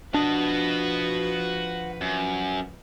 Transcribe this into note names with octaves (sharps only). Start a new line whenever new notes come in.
F3 D4 F#4 B4 D#5
F#2